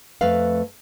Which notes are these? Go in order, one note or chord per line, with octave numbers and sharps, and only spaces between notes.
F2 A3 B4 F5